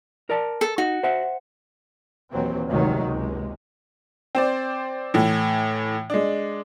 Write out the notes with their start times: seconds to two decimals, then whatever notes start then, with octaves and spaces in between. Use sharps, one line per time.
0.30 A#4 D5 A5
0.61 A4
0.78 D#4 F#4
1.03 C5 E5 F#5
2.32 D#2 A#2 E3 F#3 C4
2.69 F1 D2 C3 D#3 F#3 G#3
3.03 F#1 C#2 C3 G#3
4.35 C4 C5 D5
5.14 A2 E3
6.10 G#3 D4